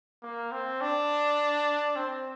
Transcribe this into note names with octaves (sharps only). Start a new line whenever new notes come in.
A#3
C4
D4
C4